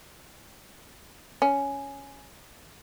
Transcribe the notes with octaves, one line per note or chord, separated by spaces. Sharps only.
C#4